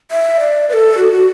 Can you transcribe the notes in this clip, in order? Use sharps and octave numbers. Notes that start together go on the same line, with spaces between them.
E5
D5
B4
A4
F#4
F#4